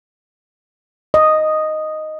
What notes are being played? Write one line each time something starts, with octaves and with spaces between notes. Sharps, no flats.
D#5